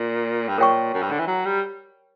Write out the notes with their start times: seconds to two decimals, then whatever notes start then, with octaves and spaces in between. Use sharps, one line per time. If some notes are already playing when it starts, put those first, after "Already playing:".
Already playing: A#2
0.48 G2
0.58 A#2 A#4 C#5 G5 C#6
0.94 F#2
1.02 G2
1.11 D3
1.19 E3
1.27 F#3
1.45 G3